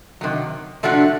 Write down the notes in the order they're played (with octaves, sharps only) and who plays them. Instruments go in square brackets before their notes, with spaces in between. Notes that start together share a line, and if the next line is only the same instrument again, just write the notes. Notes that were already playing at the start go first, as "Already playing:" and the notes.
[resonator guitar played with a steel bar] C3 D#3 F#3
C3 F3 A3 D4 F#4